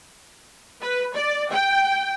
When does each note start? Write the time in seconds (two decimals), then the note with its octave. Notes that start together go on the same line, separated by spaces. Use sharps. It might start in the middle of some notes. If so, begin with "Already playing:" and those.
0.82 B4
1.15 D5
1.51 G5